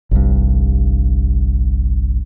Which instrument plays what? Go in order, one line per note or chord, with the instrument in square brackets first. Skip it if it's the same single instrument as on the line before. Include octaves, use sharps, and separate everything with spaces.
[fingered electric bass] G1 C2 G2